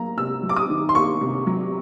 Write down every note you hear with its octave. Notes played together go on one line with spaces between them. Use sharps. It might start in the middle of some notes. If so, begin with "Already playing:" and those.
Already playing: F#3 A#3 A#5
C3 E6
F#3
D6
D#6
D#3
C6
A#3 C#6
C3
F#3